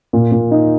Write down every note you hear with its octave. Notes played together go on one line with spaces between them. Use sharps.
A#2
A#2
D#4